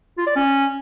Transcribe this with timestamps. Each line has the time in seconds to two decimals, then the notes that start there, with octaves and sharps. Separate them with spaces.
0.17 F4
0.27 D5
0.36 C#4